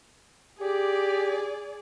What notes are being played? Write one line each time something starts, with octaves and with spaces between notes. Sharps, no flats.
G4 G#4 D5